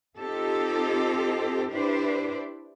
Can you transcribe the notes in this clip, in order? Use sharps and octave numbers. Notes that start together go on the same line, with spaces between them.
C4 D#4 F4 G4 A4
D4 E4 G4 B4 C5 D5